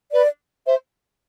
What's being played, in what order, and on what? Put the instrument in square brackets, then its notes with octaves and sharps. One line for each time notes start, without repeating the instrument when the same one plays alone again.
[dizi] B4 [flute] D5
[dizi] C5 [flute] E5